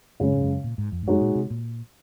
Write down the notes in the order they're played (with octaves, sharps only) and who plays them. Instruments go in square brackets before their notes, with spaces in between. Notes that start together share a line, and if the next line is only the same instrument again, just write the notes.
[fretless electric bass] F#2 [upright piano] C#3 G#3 C#4
[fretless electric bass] G#2
F#2
A#2
G#2
F2
G#2
[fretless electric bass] F#2 [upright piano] G#3 D#4 F#4 C#5
[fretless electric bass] A#2
C3
A#2